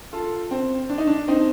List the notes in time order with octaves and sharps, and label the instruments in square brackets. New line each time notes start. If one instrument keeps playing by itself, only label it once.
[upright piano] F4 A4
C4
D4
D#4
D4
C4 D#4